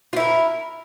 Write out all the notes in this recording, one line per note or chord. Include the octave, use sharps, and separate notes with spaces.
E4 F4 A#4